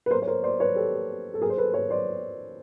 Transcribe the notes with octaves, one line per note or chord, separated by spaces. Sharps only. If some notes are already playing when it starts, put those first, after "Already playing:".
B4
A#4 C5
C#5
A#4 C5
C5 D5
B4 C#5
G4 A4
A4
G#4 A#4
C5
A4 B4
B4 C#5
C5 D5